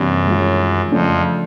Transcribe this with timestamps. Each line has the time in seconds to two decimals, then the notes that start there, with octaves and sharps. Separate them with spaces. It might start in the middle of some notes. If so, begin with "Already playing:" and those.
Already playing: F#2 C3 E3 G3 A#3 D4
0.26 D#3 G#3 C#4 F4
0.92 F2 C#3 F3 A3 D4